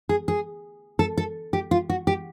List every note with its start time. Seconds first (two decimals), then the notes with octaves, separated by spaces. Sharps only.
0.09 G#4
0.28 G#4
0.99 A4
1.18 A4
1.53 G4
1.71 F4
1.89 F#4
2.07 G4